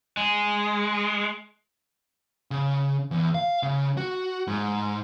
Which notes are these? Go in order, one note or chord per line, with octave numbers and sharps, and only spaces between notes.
G#3
C#3
E2
F5
C#3
F#4
G#2